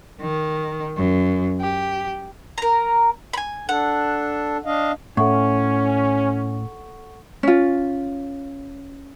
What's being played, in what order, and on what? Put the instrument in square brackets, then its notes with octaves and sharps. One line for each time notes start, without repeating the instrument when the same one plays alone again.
[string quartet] D#3
F#2
G4
[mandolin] A#4 A#5
G#5 B5
[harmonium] D4 A4 [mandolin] F#5
[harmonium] D4 D#5 F5
[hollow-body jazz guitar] A2 [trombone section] C#4 [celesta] A4 F#5 C#6
[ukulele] C#4 F4